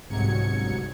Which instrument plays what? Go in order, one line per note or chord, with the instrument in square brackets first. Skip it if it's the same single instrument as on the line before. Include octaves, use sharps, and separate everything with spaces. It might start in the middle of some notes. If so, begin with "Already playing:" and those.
[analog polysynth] G1 C2 G#2 F#3 G#6 C#7